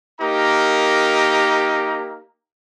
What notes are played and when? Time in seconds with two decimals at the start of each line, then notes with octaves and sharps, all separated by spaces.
0.21 A#3 D#4 G4 A#4 A#5